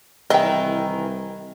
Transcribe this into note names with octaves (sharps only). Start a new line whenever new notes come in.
C2 D#3 E3 D#5 G5